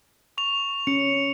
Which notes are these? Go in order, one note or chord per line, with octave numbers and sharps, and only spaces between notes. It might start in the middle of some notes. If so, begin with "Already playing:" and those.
C#6 F7
C#4 C#7